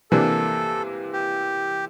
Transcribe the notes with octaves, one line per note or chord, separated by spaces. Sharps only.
C3 E3 A#3 D4 A4
G4